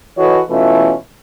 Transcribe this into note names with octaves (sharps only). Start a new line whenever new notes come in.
E3 F#4 A4 B4 C#5 D#5
B2 E3 A3 C#4 E4 F4